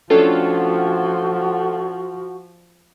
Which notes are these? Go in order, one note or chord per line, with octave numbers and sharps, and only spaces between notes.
F3 A3 C#4 D4 F4 F#4 A4 G5